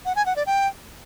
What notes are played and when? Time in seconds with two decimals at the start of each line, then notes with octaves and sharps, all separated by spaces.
0.05 F#5
0.16 G#5
0.26 F#5
0.36 D5
0.46 G5